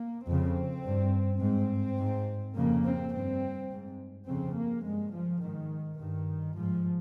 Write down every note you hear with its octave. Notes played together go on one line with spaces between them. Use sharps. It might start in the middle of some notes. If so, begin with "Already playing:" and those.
Already playing: A#3
F2 C#3 C4
G2
G#2 C4
G#2
F2 C#3 A#3
C4
G2 C4
G#2
F2 C#3 C4
A#3
G2 G#3
F3
G#2 D#3
G2 D#3
G#2 F3